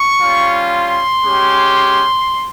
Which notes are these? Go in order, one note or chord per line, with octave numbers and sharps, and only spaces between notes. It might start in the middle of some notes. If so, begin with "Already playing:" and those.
Already playing: C#6
G3 C#4 F4
C6
G#3 C#4 G4